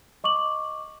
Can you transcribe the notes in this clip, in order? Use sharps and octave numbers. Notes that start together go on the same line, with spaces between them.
D#5 C#6 D6 F#7